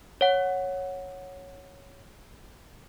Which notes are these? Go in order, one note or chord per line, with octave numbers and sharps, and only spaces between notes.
C#5 F#5